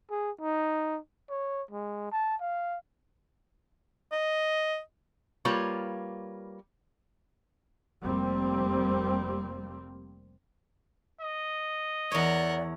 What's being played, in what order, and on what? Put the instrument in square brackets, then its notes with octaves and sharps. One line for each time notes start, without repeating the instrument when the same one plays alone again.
[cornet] G#4
D#4
C#5
G#3
A5
F5
[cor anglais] D#5
[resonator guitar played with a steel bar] G3 A#3 F4 B4 C#5
[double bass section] F1 G3 A#3 C4
[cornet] D#5
[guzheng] E2 C#5 [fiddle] A#4 F#5 [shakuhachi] D5